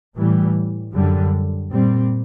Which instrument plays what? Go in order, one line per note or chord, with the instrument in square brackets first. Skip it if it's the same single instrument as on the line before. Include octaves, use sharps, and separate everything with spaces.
[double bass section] A2 E3 G3
F#2 D3 G3
A#2 G3 C4